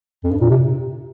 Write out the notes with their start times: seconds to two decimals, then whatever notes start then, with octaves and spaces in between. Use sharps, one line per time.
0.24 F2
0.31 G2
0.41 A#2
0.50 C3